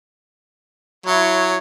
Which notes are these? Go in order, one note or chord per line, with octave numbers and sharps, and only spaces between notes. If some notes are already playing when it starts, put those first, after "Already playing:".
F#3 E4 C#5